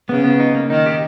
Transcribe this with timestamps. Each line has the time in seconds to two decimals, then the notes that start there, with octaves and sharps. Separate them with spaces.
0.09 C#3 B3
0.24 B3
0.40 D#4
0.55 A#3
0.70 D#3 D#4
0.86 G4